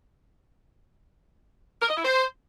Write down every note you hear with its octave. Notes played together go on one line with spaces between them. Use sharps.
A#4
D#5
E4
C5